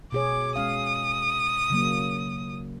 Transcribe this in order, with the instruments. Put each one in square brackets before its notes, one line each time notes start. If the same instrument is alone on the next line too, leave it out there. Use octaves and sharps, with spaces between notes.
[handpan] B2 G#4 C#5 [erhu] D6
[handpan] G#3 C#4 F5 [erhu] D#6
[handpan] C#3 F#3 A#3